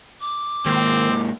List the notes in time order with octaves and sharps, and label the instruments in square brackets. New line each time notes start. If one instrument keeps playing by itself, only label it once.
[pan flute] D6
[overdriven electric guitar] G#2 A#3 [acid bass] D#3 [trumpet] C4